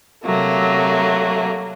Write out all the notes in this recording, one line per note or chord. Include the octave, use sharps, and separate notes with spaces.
C3 F#3 A3 A#3